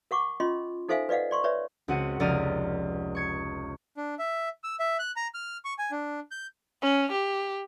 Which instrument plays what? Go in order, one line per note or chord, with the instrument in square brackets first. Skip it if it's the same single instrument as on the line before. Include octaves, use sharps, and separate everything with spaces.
[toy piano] A#4 F#5 C#6 D6
C#4 F4 D#5 C6
D#4 A4 C5 E5 F5 G#5
B4 D5 D#5 F5 F#5
D5 C6 C#6
B4 C#5 D5 E5
[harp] C#2 C4 F#4 F#5 D#7
F1 C#2 D5 A#5 F6 D#7
C#6 G#6 C#7
[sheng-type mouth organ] D4
E5
E6
E5
F#6
A#5
F6
C#6
G#5
D4
G6
[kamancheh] C#4
G4